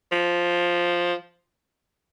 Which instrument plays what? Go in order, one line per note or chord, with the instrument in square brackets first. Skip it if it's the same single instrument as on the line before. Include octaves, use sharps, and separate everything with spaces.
[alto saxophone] F3